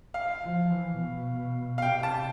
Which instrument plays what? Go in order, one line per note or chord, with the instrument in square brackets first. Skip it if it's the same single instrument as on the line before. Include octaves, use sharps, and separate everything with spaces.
[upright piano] F5
[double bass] F3
E3
B2
[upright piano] F5
[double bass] C3 [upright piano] G5
[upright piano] A5